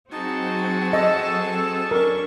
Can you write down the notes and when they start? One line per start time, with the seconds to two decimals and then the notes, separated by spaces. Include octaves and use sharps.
0.11 F#3 C4 D#4 F#4 G#4 A5
0.93 A4 D#5
1.91 C#4 D4 A#4 C#6